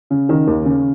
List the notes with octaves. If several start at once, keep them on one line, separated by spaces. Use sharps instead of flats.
C#3
D#3
D#2
C#3